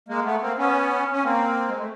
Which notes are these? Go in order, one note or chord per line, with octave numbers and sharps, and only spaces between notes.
G#3 A#3
A3 B3
A#3 C4
B3 C#4
C#4
A#3 C4
G#3
A3